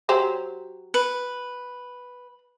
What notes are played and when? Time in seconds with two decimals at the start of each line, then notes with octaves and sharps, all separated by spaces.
0.09 F#3 G4 C5
0.94 B4